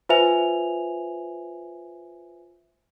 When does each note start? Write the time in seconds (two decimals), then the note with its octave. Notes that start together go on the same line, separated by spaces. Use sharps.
0.09 F4 B4 C5 E5 G#5 F7